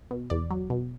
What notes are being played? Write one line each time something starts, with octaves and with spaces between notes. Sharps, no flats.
B2
E2 D5
F#3
B2